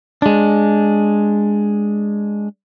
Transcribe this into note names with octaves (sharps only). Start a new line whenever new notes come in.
G#3 D4